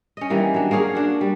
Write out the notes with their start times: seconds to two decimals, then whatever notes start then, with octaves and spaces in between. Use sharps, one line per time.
0.17 C#4 D#5
0.30 D#3 E3 G3 A#3
0.54 F#3 D4
0.71 A#3 C#4 G#4 F5
0.95 D4 F#4
1.21 G3